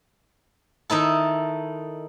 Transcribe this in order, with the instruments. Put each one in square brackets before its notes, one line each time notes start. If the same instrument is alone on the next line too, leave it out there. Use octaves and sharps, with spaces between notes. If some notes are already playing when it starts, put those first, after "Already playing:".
[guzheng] D#3 D#4 E4 A4